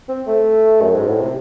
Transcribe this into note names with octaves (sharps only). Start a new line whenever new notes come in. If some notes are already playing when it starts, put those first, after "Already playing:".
C4
A3
F#2
G#2
A2
C3